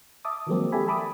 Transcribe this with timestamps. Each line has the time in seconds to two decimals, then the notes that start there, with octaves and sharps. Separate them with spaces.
0.25 E5 A5 D6 D#6
0.47 D#3 F3 F#3 G#3 A#3 C4
0.72 G4 A4 D5 E5 G#5 B5
0.87 E5 A5 B5 D6 D#6